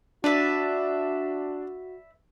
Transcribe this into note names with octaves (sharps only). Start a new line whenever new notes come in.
D4 F#4 B4 D5 E5